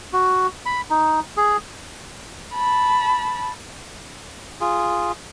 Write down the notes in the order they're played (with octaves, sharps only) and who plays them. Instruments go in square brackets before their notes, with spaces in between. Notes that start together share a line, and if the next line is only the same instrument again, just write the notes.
[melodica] F#4
B5
D#4
G#4
[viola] A5 B5
[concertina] F4 G#4